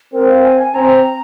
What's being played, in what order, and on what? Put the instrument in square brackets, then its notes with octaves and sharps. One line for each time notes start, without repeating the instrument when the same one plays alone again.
[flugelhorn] C4 [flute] A#4
[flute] F5
G#5
G#5
[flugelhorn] C4 [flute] A#5